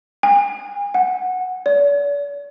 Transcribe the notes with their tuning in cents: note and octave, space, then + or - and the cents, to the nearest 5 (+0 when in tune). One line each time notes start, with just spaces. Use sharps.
G#5 -40
F#5 -5
D5 -45